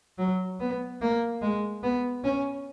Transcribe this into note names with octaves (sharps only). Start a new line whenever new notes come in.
F#3
B3
A#3
G#3
B3
C#4